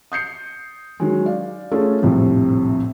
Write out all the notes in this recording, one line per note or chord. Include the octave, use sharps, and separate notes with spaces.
D#6 G6 C7 C#7
D#3 F#3 G#3
D5 F5
A3 C#4 F4 G#4 A4
A#1 F2 A2 C3 G3